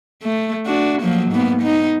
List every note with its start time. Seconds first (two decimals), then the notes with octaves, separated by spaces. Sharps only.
0.22 A3
0.66 D4 F#4
1.02 F3 F#3 A#3
1.31 G#2 A#3 B3
1.62 B3 D#4